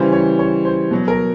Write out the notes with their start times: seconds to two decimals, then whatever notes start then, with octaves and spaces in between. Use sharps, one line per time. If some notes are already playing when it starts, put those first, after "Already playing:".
Already playing: C#3 E3 G3 C5
0.12 C#5
0.39 C#5
0.65 C5
0.91 B2 F#3
1.08 A#4